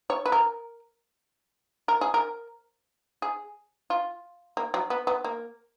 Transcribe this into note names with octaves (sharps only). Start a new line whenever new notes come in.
C#5
B4
A#4
A#4
G#4
A#4
G#4
F4
A#3
F#3
B3
B3
A#3